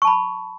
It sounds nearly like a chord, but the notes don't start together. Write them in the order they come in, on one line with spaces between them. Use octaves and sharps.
C#6 A5 B5